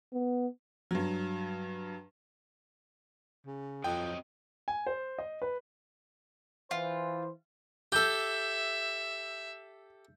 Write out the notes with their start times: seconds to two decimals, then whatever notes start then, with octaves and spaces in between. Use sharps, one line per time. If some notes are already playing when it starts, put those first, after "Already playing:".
0.13 B3
0.91 G2 F#3
3.46 C#3
3.84 F2 F#3 C4 D#5 G5
4.68 G#5
4.87 C5
5.19 D#5
5.42 B4
6.71 E3 F4 C5
7.92 G4 A4 E5 G6